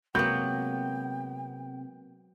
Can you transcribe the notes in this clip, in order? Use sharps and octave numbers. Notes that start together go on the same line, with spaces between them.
C3 F#3 G#3 A#3 B3 G5 B5 G6